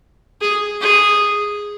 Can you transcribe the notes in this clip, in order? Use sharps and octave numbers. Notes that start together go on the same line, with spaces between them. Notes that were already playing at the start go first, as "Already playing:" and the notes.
G#4
G#4